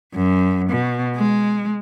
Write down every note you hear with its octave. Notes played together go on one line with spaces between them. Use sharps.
F#2
B2
G#3